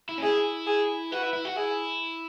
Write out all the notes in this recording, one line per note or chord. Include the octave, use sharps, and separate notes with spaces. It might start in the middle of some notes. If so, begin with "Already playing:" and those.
E4
C#4
E4 G#4
G#4
F#4 B4
E4
E4
F#4
E4 G#4